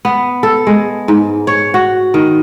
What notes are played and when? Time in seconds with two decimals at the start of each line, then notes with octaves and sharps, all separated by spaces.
0.05 B3
0.43 A4
0.67 G#3
1.08 G#2
1.47 C#5
1.74 F#4
2.14 D#3